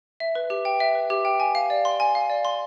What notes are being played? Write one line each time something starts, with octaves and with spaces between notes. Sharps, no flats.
E5
B4
G4
G5
E5
B4
G4
G5
G#5
F5
D5
C6
G#5
F5
D5
C6